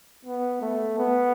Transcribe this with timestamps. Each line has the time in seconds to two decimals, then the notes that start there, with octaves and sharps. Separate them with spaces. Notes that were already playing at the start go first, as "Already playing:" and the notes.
0.25 B3
0.61 A3
0.98 B3